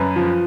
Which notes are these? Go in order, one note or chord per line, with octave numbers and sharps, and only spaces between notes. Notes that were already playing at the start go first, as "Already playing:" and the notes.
Already playing: F#2 B4
F3